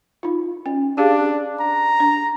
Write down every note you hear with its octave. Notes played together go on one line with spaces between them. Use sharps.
D#4 F4
C#4
D4 G4 G#4 F5
A#5
D4